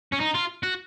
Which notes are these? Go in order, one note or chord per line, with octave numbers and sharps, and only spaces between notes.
C#4
D#4
F4
F#4